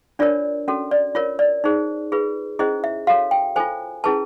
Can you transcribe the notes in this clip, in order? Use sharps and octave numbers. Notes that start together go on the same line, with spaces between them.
D4 F4 A#4 C#5 D5
C#4 F#4 A4
D5
F4 A#4 C#5
D5
D#4 G#4 C5
F4 G#4 B4
C#4 E4 G#4 C5 D#5
E5
F#4 A4 C#5 F5
G5
F4 A4 C5 G#5
C#4 E4 G#4 B4 A5